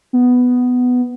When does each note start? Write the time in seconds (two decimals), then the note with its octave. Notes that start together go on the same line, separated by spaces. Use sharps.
0.13 B3